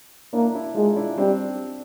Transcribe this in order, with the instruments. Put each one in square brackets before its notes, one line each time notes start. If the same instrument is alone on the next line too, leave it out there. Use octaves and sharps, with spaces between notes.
[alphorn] A#3 [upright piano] D4 E4
[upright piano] D4 E4
[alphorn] G#3 [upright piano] D#4 F4
[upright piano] D4 E4
[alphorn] G3 [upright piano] C4 D4